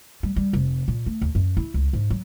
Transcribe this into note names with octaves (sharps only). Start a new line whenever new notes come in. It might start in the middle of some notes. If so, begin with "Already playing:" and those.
G3
G3
F1
A#2
A3
D#2
F#2
E4
C#2
G#2
F#3